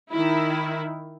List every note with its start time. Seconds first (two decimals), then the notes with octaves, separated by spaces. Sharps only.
0.12 D#3 E4